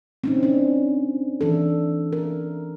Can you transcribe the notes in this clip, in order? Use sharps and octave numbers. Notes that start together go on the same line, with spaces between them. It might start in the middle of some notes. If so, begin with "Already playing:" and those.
C4 C#4 D#4
C#4 D4
E3 D4 A4
A#4